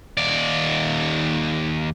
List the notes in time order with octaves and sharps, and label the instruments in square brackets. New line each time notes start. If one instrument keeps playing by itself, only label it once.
[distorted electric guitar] D#2 D5